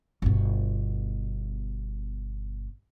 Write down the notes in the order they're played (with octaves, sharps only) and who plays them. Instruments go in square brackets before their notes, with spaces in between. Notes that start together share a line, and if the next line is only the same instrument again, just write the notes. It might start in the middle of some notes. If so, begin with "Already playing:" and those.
[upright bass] G1 B2